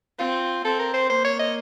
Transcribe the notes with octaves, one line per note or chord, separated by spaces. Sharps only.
C4 F4
C4 A4
A#4
C5
A#3 C5
C#5
D#5